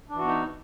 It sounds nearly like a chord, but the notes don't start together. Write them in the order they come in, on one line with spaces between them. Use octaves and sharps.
D4 E3 F#4 B3 D#4